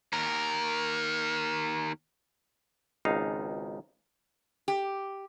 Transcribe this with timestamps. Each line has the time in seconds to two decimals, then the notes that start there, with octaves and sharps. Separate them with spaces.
0.13 D#2 A#4
3.05 G#1 C#2 D#4 F5
4.68 G4